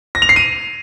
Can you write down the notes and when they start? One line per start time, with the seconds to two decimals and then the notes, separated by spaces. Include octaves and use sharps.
0.15 A#6
0.22 F7
0.29 C7
0.36 D#7